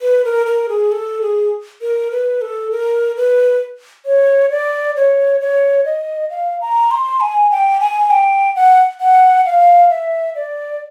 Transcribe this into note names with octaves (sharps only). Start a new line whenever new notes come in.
B4
A#4
A#4
G#4
A4
G#4
A#4
B4
A4
A#4
B4
C#5
D5
C#5
C#5
D#5
F5
A#5
C6
G#5
G5
G#5
G5
F#5
F#5
F5
E5
D5